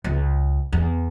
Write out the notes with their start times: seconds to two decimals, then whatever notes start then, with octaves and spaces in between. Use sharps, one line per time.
0.04 C#2
0.73 E2